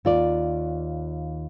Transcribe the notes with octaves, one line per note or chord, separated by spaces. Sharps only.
D#2 F4 D5